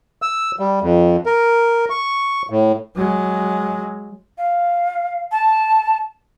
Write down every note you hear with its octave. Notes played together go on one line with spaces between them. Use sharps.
E6
G3
F2
A#4
C#6
A2
F#3 G#3
F5
A5